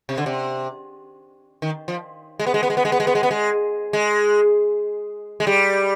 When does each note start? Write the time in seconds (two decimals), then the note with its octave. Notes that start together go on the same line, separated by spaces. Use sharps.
0.09 C3
0.18 D3
0.26 C3
1.62 D#3
1.88 F3
2.39 G#3
2.47 B3
2.54 G#3
2.63 B3
2.70 G#3
2.77 B3
2.85 G#3
2.92 B3
3.00 G#3
3.07 B3
3.15 G#3
3.23 B3
3.31 G#3
3.93 G#3
5.40 G#3
5.47 G3